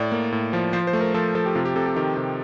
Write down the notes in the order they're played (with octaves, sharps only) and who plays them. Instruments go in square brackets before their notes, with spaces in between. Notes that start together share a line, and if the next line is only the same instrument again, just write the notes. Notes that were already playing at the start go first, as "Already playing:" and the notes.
Already playing: [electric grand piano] A2 D5
A#3
A2
F3
F3 C5
C5
A3
A#4
F3 A4
F3 A4
G4
C3 F4
G4
C3 A4
G4
D#3 G4
C3